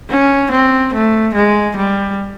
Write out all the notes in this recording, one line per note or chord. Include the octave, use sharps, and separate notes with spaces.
C#4
C4
A3
G#3
G3